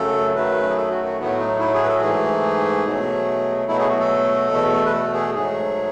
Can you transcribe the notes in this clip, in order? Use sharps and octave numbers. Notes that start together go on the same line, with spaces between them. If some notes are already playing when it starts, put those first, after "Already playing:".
Already playing: F#2 C#3 F#3 A3 A4
F#2 D#3 F#3 A3 B4
G#4
A4
F#4
F#4
A2 F#3 A3 B3
D#4
E4
G#4
B4
A4
F#4
G#2 E3 A3 G#4
B2 F#3 A3
B2 F#3 A3 E4
G#4
F#4
A4
E2 B2 A3
B4
A4
G#4
G#2 F#3 A3 G#4